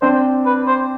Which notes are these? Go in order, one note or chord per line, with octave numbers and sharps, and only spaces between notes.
C4 D4 C5
B4
C5